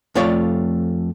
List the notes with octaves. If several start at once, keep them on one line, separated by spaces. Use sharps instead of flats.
F2 A3 F4 C#5 D5